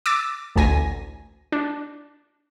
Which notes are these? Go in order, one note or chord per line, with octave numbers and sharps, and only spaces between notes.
D6 E6 A6
A1 D2 G#5 A#6
D4